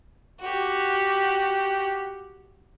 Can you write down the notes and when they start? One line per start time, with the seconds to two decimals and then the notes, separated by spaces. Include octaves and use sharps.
0.41 F#4 G4